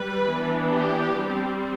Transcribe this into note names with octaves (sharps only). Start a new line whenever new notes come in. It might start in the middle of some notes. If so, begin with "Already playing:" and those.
Already playing: G3 B4
E3 B3 D4
G4
G3 C4